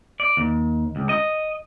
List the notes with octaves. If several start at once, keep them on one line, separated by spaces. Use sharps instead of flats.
D5
D#2
C#2
D#5